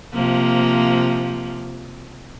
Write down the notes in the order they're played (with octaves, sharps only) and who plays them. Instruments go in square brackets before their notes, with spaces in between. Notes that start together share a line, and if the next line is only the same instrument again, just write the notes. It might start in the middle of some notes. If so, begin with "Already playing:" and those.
[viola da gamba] C3 F3 A#3